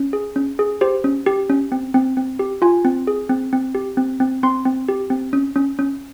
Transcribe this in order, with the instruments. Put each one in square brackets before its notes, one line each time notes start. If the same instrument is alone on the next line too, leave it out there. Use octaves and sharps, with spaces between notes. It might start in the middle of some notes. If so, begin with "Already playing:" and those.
Already playing: [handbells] C#4
G#4
C#4
G#4
G4 C5
C#4
G4
C#4
C4
C4
C4
G4
F4 G#5
C4
G#4
C4
C4
G4
C4
C4
C4 C6
C4
G4
C4
C#4
C#4
C#4